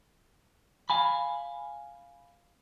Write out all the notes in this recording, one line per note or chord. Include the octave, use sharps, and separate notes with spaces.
F5 G#5 B5